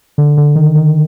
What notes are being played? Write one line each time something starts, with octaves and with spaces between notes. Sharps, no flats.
D3
D3
D#3
D#3